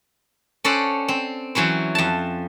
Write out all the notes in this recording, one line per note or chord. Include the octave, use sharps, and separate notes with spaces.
C#4 A4 C5 D5 F#5
C4
E3 F#3 C#4 C5
F2 A5